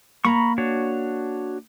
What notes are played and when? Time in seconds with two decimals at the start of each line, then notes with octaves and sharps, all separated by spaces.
0.25 A#3 A#5 B5 C#6
0.58 D4 F#4 C#5